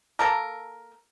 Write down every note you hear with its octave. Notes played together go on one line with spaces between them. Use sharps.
A#3 A4 A#4